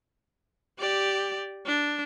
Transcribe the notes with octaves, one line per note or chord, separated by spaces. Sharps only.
G4 D5
D4